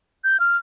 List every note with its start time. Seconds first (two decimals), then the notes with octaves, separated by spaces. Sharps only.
0.24 G6
0.40 F6